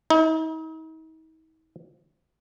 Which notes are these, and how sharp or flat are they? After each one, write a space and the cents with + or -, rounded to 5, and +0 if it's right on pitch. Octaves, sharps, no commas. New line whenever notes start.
D#4 +45